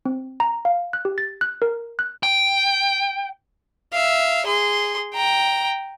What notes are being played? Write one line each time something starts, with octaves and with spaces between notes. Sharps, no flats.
C4
A#5
F5
F#6
G4
A6
F#6
A#4
F#6
G5
E5 F5
G#4 C6
G5 A#5